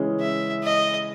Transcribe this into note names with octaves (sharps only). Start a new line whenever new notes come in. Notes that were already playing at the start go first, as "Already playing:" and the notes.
Already playing: C#3 E3 G#3 C#4 G#4
E5
D#5